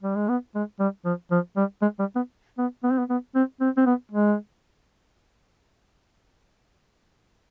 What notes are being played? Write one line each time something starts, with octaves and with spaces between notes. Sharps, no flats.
G3
G#3
B3
G#3
G3
F3
F3
G3
G#3
G3
B3
B3
B3
C4
B3
B3
C4
C4
C4
B3
G#3